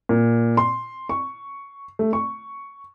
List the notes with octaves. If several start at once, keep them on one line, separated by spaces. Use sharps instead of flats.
A#2
C6
C#6
A3
C#6